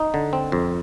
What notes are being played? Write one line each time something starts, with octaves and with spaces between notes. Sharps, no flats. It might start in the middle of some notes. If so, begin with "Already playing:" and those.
Already playing: D#4
D3
C4
F2